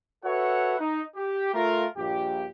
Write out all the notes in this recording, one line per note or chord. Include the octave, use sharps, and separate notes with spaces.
F#4 A4 B4 C#5 E5 F#5
D#4
G4
A3 F4 A#4
A#1 G2 A#2 G4